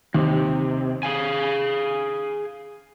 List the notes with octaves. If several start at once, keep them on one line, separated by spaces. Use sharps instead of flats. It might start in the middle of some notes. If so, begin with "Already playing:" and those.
D#2 C3
G#4 F5 G#5